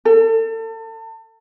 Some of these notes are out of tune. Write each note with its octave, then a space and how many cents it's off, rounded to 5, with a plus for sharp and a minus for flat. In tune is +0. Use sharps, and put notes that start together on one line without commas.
A4 +35